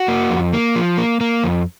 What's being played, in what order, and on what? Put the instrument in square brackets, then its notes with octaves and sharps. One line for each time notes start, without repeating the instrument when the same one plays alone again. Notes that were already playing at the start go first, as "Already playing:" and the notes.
Already playing: [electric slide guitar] F#4
A#3
F2
A#3
F3
A#3
A#3
F2